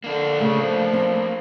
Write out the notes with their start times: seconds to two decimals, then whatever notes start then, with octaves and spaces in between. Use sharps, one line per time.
0.04 D3 A#3 D4
0.40 C#3 A3
0.61 F3
0.93 C4